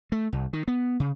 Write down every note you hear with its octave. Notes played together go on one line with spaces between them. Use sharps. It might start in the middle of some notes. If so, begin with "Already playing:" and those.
A3
C2
D#3
B3
C#3